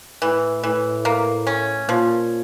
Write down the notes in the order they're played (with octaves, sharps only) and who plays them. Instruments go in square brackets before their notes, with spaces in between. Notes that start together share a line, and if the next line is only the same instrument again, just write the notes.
[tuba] A2 [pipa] E3
[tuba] A2 [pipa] E3
[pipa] A#3
C#4
[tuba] A#2 [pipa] F3